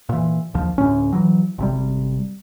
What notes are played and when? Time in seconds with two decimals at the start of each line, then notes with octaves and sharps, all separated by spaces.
0.09 A#2 E3
0.54 A#1 D#2 F3
0.78 D2 A2 C#4
1.12 E3 F#3
1.58 G#1 C3 G3